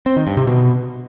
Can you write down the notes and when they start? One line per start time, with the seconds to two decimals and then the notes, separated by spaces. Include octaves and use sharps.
0.06 C4
0.16 D#3
0.27 G2
0.37 C3
0.47 B2